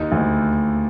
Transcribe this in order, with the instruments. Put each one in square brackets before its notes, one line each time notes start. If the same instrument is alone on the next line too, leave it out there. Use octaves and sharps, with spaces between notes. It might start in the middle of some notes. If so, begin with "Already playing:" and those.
Already playing: [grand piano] D#2 D#4
D2